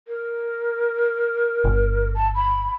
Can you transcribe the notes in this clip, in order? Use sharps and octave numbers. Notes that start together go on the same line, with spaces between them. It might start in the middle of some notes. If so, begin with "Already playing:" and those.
A#4
G1
A5
B5